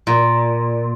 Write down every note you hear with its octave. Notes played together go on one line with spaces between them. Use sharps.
A#2